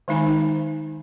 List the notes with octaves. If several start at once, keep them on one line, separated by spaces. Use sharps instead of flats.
D#3 G#3 D#4 G#5 A#5